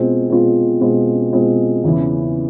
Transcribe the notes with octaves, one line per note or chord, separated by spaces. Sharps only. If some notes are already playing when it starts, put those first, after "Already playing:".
Already playing: B2 G#3 C4 F4
B2 G#3 C4 F4
B2 G#3 C4 F4
B2 G#3 C4 F4
E2 C#3 E3